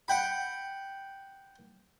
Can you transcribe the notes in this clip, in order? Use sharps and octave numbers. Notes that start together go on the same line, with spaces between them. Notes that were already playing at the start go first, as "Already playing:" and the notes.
F#5 G5 B5